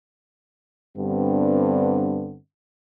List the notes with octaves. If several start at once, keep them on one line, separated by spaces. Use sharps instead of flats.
G2 D3 G3 B3 C4